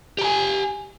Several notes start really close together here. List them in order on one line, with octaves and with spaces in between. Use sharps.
G4 A#5 G#5